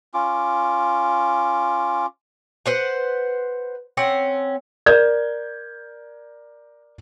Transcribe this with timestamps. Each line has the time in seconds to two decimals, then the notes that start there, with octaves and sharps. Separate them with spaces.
0.14 C#4 F4 D6
2.66 B4 C5 F#5
3.97 C4 C#4 F#5
4.86 A#4 D5 G6 G#6